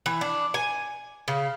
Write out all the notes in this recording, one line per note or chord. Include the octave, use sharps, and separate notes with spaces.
E3
D4
G#5
C#3